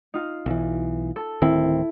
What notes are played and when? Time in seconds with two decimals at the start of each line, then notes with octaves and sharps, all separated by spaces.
0.14 D#4 F4
0.46 B1 E3
1.16 A4
1.42 D1 D#3 C4 E4